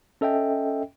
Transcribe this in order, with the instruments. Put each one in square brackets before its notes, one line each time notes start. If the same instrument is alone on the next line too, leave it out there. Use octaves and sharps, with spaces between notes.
[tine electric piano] C#4 A4 D#5 E5 G5